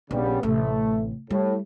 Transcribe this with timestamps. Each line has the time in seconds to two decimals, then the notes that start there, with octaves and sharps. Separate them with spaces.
0.11 A#1 C#3 G3 B3
0.43 A1 C3 A3
1.30 A2 G3